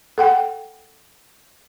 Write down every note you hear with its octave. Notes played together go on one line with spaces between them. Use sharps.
A4 F#5 G5